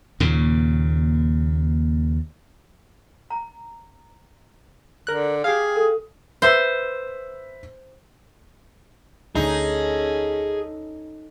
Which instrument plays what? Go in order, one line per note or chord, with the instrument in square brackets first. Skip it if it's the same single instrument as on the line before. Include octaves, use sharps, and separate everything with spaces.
[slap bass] D#2 A#2 C#3
[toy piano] A#5
[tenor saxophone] D3 [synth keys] A#4 F#6
[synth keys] G4 F5 [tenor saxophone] G#4
[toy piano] A4
[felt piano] B4 E5 E6 [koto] C5
[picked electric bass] D2 D3 A3 [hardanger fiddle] C#4 A4 [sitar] D#4 [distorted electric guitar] G#4